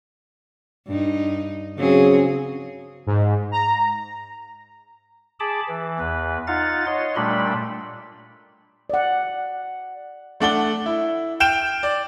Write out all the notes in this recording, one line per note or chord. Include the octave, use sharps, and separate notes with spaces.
G2 D#4
C#3 F#3 C4 G#4
G#2
A#5
G#4 A5 B5 D6
E3
E2 B4
D#4 F4 F5 F#5 A6
C#5 D#5 C6
A#2 G3 A3 D4 B5
D5 F#5
A3 D4 F#5 G7
E4
G5 F6 G6 D7 E7
D5